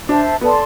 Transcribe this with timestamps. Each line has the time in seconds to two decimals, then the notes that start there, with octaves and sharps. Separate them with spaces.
0.08 D4 C5 E5 A5
0.41 B3 A4 D5 A5 C6